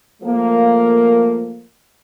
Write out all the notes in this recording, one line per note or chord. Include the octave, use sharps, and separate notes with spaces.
F3 A3 A#3